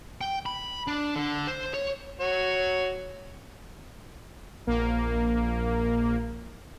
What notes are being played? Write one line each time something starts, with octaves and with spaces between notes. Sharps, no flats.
G5
B5
D4
D3
C5
C#5
F#4 C#5
A#1 A#3